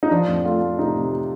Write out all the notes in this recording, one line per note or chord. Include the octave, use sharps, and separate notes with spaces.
D#4
F3 D4
F2
A3 F4
A3
C3 D#4
C3